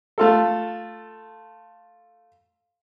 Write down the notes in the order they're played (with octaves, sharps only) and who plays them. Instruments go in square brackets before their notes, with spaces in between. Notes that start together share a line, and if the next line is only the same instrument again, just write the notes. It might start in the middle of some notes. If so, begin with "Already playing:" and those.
[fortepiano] A3 F4 A4